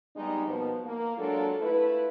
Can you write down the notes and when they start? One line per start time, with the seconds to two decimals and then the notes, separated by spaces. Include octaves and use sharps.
0.15 G3 G#3 B3 D#4
0.45 B2 F3 A#3 B3
0.85 A#3
1.18 F#3 G#3 D4 F4 A4 A#4
1.60 A3 E4 F4 B4